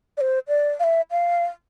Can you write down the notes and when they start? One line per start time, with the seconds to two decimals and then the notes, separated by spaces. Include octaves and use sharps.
0.17 D5
0.21 C5
0.48 D5
0.80 F5
0.84 E5
1.11 F5